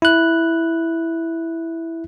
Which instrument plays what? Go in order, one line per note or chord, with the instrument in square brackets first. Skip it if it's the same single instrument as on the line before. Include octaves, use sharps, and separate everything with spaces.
[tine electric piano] E4 F#6